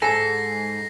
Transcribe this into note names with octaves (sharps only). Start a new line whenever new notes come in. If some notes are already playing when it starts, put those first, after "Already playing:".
G#2 A4 G#5 A#6 C7